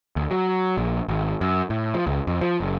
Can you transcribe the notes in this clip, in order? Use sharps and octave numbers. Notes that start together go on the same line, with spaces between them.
D2
F#3
A#1
G#1
F#2
A2
F3
C#2
F2
F3
F#1